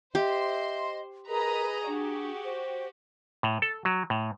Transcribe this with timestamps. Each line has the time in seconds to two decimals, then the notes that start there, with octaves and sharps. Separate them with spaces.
0.15 G4 C5 D#5 E5 C6
1.28 G#4 A#4 B4 D#5 A#5
1.87 D4 F#4 G4
2.44 C5
3.43 A2
3.62 A4
3.85 F#3
4.10 A2